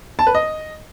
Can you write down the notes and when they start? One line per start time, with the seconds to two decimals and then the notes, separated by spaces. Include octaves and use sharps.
0.19 A5
0.27 B4
0.35 D#5